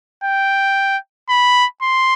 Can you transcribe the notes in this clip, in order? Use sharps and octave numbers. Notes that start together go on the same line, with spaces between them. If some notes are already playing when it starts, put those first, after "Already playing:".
G5
B5
C6